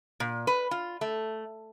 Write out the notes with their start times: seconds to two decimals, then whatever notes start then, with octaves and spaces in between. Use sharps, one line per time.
0.20 A#2
0.47 B4
0.71 F4
1.01 A3